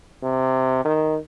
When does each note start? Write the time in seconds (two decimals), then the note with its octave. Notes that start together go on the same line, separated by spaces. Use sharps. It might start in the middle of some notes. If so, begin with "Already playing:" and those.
0.23 C3
0.85 D#3